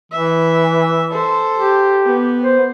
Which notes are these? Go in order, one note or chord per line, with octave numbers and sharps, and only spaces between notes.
E3 E5
A4 C5
G4
B3
C5